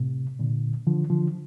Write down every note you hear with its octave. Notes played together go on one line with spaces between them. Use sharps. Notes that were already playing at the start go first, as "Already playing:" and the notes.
Already playing: A2 C3
A#2 D3
D3 F3
D3 F3